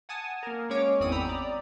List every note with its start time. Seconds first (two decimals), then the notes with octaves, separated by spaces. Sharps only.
0.09 F#5 G#5 A5 D#6
0.43 A#3 A#4
0.70 G#3 C#4 C#5 D6
1.00 G#1 E2 C4 D5 D#6 D#7
1.12 G5 A#5 B5 D#6 E6
1.25 D5 A#5